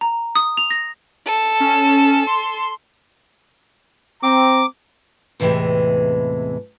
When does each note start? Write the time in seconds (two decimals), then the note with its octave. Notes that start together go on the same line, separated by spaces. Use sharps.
0.01 A#5
0.35 D#6
0.57 F7
0.70 A#6
1.26 A4 E7
1.60 C#4
2.27 C6
4.23 C4 A#5 D6
5.40 E2 A2 C3 E3 G#3